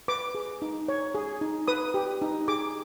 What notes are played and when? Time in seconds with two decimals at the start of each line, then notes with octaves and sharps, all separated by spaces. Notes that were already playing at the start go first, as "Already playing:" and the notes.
0.08 B4 D6
0.35 G#4
0.62 D#4
0.88 C#5
1.15 G#4
1.41 D#4
1.68 B4 D#6
1.94 G4
2.22 D#4
2.48 G#4 D6